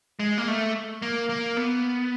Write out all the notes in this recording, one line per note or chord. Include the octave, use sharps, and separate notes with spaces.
G#3
A#3
A3
A#3
A#3
B3